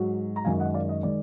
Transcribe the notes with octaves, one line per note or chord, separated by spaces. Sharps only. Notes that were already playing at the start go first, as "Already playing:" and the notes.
Already playing: G#2 F#3
A#5
F#2 D#3 G#3 F5 G#5
D#5 F#5
D5 F5
D#5
D#3 G#3 D5